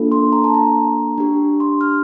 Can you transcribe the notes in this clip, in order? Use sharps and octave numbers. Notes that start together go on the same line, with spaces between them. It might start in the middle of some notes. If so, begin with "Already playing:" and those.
Already playing: A#3 D4 F4 A4
C6
A#5
A5
A#5
D4 G4
C6
F6